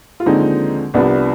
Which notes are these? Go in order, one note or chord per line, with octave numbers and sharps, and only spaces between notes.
F4
D#2 D3 F3 G#3 C4 D#4
C2 C3 F3 B3 D4